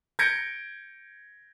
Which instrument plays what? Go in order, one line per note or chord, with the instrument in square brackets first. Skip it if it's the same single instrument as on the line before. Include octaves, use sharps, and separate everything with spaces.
[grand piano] G6 G#6 A#6 C#7 D7